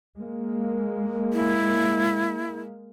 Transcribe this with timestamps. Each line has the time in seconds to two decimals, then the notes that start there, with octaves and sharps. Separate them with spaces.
0.18 G#3 A#3
1.33 E4